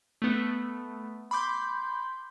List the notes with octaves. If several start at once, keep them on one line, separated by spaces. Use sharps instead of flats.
A3 B3
B5 C6 D6 G6